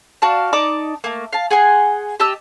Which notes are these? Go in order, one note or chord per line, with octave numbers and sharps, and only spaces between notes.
F#4 D5 F5 A5
D#4 D5 A5 D6
A3 A#3
F5 A5
G#4 F#5 G#5 C6
G4 D#5 A5 E6